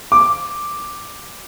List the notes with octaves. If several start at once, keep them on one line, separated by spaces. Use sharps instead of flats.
D6